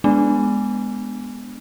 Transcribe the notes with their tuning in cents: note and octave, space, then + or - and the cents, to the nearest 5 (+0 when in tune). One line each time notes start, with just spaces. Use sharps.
G#3 +0 B3 +0 D4 -5